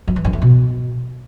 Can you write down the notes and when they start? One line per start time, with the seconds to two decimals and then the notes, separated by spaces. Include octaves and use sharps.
0.08 F3
0.16 E3
0.25 G2
0.33 A3
0.42 B2